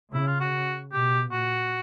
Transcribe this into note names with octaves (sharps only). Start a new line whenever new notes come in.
C#3 E4
F4
F#4
B2 G4
A#2 F#4